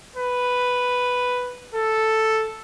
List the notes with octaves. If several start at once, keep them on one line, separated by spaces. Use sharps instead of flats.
B4
A4